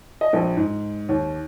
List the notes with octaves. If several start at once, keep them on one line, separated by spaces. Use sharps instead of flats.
D#5
A#1
G#2
D#2